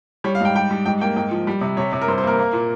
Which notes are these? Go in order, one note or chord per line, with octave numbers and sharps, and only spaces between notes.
G3 C#5
F5
G#2 G5
G3 G5
G3
G#2 G5
A#3 G5
G#2 G5
F3
G3
C3
C3 C#5
C3
A#4
G2 C5
C5
A#3 A#4
A#3
A#2